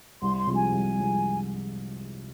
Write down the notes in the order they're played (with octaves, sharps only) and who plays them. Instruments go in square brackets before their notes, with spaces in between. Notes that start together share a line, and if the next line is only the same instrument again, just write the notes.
[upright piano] C2 [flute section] C6
[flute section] C6
[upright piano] C3 F3 G#3
[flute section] G#5
[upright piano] C2
C3 F3 G#3